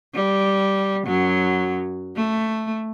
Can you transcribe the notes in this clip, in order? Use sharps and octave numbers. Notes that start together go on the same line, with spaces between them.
G3
F#2 F#3
A3